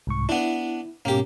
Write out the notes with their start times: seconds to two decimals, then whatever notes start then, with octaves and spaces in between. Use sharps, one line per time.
0.07 C2 G#2 C#6
0.29 B3 D4 E4
1.05 G#2 B2 A#3 C#4 G4